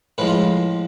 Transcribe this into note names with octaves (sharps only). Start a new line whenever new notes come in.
A2 F3 G#3 B4
F4